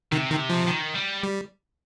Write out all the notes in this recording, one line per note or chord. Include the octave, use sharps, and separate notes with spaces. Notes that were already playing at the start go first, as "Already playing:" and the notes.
C3 D#3
D#3
F3
D#3
G3
G3